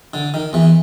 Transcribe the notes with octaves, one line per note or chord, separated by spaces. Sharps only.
D3
D#3
E2 E3